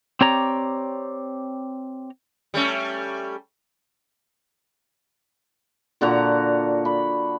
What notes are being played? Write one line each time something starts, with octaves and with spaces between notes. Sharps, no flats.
C4 G4 C#5 D5 A#5
G3 A3 C#4
A#2 D3 F#4 A#5
B5